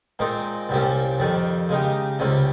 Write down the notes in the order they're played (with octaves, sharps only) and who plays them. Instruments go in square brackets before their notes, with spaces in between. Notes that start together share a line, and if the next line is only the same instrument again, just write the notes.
[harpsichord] A#2 G#3 C4 D#4
C2 A#2 G3 C#4 G4
F2 D#3 G3
C#3 G#3 D#4 G4
C#2 C3 G3 C#4